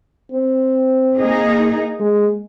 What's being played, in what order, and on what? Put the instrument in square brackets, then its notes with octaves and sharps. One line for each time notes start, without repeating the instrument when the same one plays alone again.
[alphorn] C4
[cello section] A#3 D#4 G#4
[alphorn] G#3